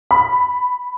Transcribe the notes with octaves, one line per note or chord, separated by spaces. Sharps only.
B5